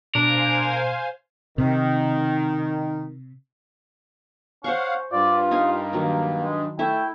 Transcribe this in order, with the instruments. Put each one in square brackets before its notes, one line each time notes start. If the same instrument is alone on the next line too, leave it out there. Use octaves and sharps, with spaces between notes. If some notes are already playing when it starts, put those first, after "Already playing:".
[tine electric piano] B2 [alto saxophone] D4 [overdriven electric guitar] A#4 [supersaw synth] C5 F5 G#5
[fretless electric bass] C3 [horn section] D#3
[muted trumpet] C#4 [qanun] C5 C#6 [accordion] F5 F#5
[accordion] G2 [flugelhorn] F4 [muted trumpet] D5
[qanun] D#4 F5 G#5 [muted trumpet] A#4
[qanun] D#3 F#3 [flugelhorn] A#3
[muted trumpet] G#3
[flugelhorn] A3 [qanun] E4 E5 [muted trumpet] G5